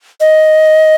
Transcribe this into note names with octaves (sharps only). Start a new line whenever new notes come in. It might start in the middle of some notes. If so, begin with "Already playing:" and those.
D#5